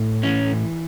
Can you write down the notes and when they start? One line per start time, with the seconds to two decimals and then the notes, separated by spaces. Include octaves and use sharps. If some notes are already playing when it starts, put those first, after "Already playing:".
Already playing: A2
0.23 E3 C#4